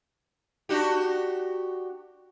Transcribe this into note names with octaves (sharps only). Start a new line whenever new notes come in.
D4 F#4 G4